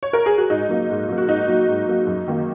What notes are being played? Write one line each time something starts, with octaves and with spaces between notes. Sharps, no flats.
C#5
A#4
G#4
F#4
G#2 D#4
F#3 A#3
G#2
F#3 A#3
F#4
G#2 D#4
F#3 A#3
G#2
F#3 A#3
F#2
D#3 A#3